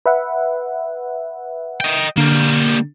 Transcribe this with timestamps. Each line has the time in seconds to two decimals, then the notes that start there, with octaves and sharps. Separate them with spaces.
0.06 B4 E5 F#5
1.80 D#5 G5
2.17 D3 G3 A#3